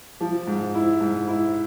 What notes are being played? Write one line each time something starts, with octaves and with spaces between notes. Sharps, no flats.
F3
G#2
E4
G#2
E4